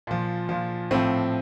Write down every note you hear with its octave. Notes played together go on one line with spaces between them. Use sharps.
A#2 F3
A#2 F3
A2 F3 C4